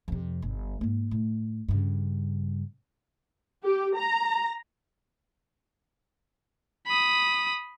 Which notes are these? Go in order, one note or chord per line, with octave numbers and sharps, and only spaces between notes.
F2 C3
G1
G#2 A#3
A2
G2 C#3
G4
A#5
B5 D#6